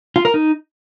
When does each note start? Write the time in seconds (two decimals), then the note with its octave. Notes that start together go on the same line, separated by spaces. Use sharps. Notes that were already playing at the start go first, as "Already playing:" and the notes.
0.16 F4
0.25 A#4
0.34 D#4